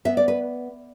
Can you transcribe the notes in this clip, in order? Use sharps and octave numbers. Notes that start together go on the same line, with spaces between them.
B3 E5
D5
B4